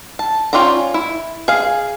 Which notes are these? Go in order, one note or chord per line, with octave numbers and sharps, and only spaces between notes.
A5
C#4 F4 D5 G5 A#5
E4
G#4 F5